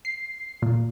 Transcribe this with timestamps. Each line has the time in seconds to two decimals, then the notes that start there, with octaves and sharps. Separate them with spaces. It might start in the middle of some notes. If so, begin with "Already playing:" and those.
0.05 C7
0.62 A#2